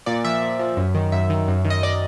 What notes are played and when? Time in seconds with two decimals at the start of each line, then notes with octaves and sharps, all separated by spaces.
0.06 A#2 D5
0.25 F3 E5
0.42 A#2
0.59 F3
0.77 F#2
0.95 D#3
1.12 F#2 E5
1.30 D#3
1.48 F#2
1.65 D#3
1.70 D#5
1.83 D5